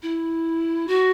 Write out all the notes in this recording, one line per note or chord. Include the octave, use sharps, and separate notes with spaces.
E4
F#4